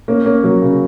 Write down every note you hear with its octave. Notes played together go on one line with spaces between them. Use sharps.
A#3 C#4
A#3 C#4
F#3 A#3
C#3